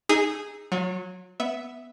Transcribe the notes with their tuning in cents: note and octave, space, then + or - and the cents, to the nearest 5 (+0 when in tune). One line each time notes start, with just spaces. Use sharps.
D#4 +0 G#4 -10 E6 +0
F#3 -15 F4 +40
B3 +0 E5 +0